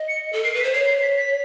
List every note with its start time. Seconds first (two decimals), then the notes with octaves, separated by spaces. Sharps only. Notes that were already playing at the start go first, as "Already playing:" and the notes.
Already playing: D#5
0.08 C#7
0.33 A4
0.44 A#4 C7
0.54 B4
0.60 B6
0.64 C5
0.73 C#5 C7
0.88 C7
1.02 B6
1.17 B6